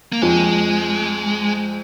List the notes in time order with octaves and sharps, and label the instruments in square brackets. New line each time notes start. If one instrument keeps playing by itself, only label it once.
[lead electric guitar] A#3
[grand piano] F2 F3 [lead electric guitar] G#3